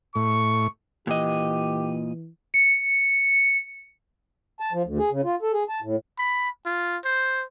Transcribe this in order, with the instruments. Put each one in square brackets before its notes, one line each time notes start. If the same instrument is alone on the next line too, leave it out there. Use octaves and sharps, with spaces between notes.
[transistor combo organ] A2 [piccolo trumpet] C#6
[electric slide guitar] A#2 D#5 [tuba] E3 [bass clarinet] G4
[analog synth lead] C#7
[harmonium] A5
F3
D2
G#4
C#3
F4
A4
G#4
A5
A2
[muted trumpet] B5
F4
C5